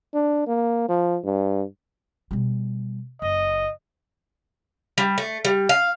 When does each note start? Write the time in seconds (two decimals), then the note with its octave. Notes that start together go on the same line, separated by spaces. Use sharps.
0.14 D4
0.47 A#3
0.89 F3
1.24 G2
2.31 B2 G3
3.22 F#1 D#5
4.98 G3
5.18 A3
5.45 G3
5.69 F5